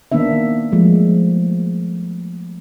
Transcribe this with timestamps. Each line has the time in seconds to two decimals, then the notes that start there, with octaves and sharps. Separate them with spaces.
0.12 D#3 A#3 B3 D4 E5
0.72 F3 G#3 A3